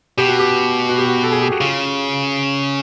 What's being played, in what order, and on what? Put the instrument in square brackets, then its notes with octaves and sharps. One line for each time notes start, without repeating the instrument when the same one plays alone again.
[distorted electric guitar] B2 [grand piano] G4
[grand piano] F#4
G4
F#4
G4
F#4
A4
G#4
G4
F#4
[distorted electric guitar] C#3 [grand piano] F4